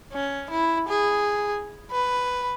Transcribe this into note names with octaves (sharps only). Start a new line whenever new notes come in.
C#4
E4
G#4
B4